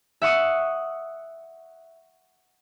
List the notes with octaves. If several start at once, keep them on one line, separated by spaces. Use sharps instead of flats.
E5 F#5 C#6 D#6